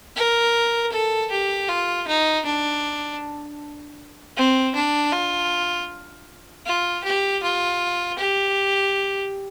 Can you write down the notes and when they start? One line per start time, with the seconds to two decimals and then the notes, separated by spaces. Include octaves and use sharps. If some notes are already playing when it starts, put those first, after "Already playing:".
0.16 A#4
0.92 A4
1.31 G4
1.69 F4
2.08 D#4
2.46 D4
4.37 C4
4.75 D4
5.12 F4
6.66 F4
7.04 G4
7.43 F4
8.19 G4